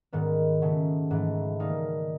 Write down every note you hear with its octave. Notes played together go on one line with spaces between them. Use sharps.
G#2 D#3 G3 B3
C#3 F#3 A3
G#2 E3 A3
D#3 G3 A#3 D#4